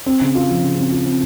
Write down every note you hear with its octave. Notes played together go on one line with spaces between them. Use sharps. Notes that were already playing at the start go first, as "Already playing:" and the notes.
C4
C#3
F4
F3
C#3
C4
F4
C4